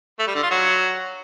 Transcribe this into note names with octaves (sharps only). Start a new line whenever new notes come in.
A3
G3
D3
F4
F#3